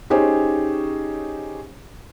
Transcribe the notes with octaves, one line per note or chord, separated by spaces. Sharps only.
C#4 D#4 G4 G#4 C5 C#5